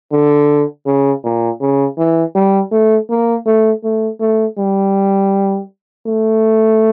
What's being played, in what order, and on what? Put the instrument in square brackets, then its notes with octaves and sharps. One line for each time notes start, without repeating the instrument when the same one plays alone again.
[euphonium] D3
C#3
A#2
C#3
E3
G3
A3
A#3
A3
A3
A3
G3
A3